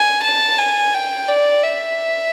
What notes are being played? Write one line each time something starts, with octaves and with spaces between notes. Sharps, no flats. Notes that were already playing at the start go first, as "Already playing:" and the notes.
Already playing: G#5
A5
G#5
G5
D5
E5